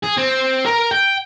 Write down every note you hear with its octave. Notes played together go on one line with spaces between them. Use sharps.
G#4
C4
A#4
G5